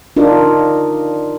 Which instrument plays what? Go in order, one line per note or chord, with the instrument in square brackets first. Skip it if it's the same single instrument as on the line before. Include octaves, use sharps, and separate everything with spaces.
[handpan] D4 D#4 F4 A#4